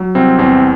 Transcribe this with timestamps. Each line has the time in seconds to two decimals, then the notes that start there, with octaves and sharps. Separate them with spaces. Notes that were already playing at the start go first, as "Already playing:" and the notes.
Already playing: F#3
0.15 C2 C4
0.38 E2 C4